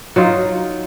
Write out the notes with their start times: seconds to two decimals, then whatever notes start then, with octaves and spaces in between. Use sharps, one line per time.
0.16 F#3 D#4 F4